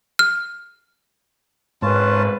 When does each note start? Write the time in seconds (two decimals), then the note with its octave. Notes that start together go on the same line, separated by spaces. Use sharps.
0.19 F6
1.82 G#1 G#2 C#4 F4 B4 A5